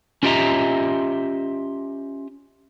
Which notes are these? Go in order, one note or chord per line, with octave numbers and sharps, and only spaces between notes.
C#4 F4 G4 D#5 E5 A#5